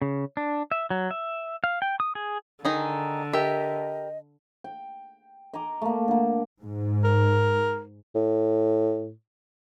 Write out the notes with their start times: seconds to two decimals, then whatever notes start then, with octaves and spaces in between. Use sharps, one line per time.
0.02 C#3
0.37 D4
0.71 E5
0.90 F#3
1.11 E5
1.64 F5
1.82 G5
2.00 D#6
2.15 G#4
2.65 D3 D#3 D#4 G#4
3.33 G4 A#4 D#5 E5
4.64 G5
5.54 D#5 G#5 A#5 D6
5.82 A3 A#3
6.08 D3 A#3
6.62 G#2
7.04 A#4
8.15 A2